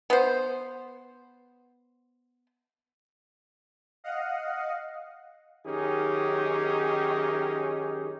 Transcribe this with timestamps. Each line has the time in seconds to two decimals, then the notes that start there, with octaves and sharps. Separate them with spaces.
0.10 B3 C5
4.04 D#5 F5 F#5
5.66 F#2 D#3 C#4 D#4 G4 G#4